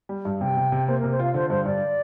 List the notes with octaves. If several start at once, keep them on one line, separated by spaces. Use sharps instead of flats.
G3
G2
C3 G5
C3
C3
A#3 C5
C3 A#4
C5
F4 F5
D3 C5
G2 C5
G2 D5